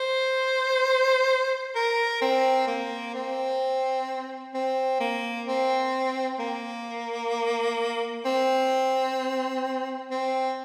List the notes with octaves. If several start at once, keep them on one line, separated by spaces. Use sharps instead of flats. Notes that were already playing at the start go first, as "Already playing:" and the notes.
Already playing: C5
A#4
C4
A#3
C4
C4
A#3
C4
A#3
C4
C4